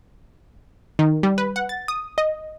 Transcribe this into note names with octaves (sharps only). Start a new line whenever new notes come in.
D#3
G3
B4
F#5
A6
D#6
D#5